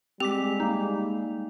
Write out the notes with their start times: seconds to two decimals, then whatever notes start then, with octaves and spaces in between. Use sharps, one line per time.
0.20 G3 G#3 C4 G4 D6 B6
0.60 A#3 D#4